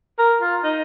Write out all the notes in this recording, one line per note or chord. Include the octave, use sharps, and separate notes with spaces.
A#4
F4
D#4